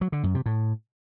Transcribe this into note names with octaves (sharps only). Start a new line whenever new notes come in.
F#3
D3
F#2
C3
A2